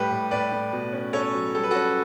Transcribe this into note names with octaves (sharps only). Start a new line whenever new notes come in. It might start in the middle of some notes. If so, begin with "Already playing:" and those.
Already playing: A2 G3 G4 B4
A2
A2 B4 D5
A2
B2
C#4
C#4 A4 C#5
F#3
G3 A4
B4
C#4 F#4 A4